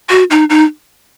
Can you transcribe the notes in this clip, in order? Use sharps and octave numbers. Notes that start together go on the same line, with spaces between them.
F#4
D#4
D#4